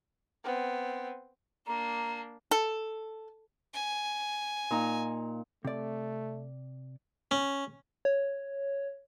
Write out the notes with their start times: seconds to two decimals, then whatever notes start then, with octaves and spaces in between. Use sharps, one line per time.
0.45 B3 C4
1.67 A#3 D4 A#5
2.51 A4
3.74 G#5
4.71 A#2 D#4 A#5
5.65 C3 A3 D5
7.31 C#4
8.05 C#5